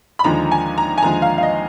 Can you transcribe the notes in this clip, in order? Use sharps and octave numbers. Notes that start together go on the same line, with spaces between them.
B5
D#2 D3 F3 G#3 A#5
G#5
A#5
G#5
D#2 D3 F3 G#3 A#5
F5
F5
D#5